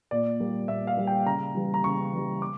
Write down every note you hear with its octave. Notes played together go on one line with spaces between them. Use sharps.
A#2 D5
G3 A#3
A#2 E5
F5
G3 A#3
G5
C#3 A#5
E3 G3
A#5
C#3 C#6
E3 G3
D6